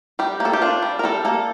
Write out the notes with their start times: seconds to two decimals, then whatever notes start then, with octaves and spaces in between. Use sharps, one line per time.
0.19 G3 G4
0.40 A#3
0.45 A4
0.53 G4
0.62 D4 F4
0.82 G3
0.99 A#4
1.04 G3 A4
1.25 A#3 A4